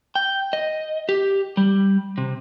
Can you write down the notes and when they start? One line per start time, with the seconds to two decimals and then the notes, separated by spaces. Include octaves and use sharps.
0.15 G5
0.53 D#5
1.09 G4
1.57 G3
2.18 C3